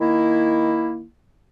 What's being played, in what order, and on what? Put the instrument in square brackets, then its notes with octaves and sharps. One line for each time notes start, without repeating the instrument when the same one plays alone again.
[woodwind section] D#3 A#3 E4